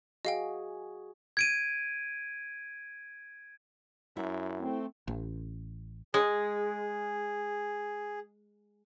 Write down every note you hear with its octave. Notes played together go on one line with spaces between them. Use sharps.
F#4 G#4 D#5 F5 G5
G#6 D7 D#7
F#2 E4 E5 F#5
A3 C4
A1
G#3 G#4